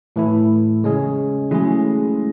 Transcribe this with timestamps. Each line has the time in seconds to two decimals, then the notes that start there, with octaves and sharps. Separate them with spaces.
0.16 A2 E3 A3 E4
0.84 C#3 G#3 C#4 G#4
1.51 E3 F#3 G#3 A3 C#4 G#4